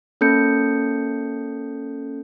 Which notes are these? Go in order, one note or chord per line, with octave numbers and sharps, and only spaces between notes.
A#3 C#4 A4 G6 C#7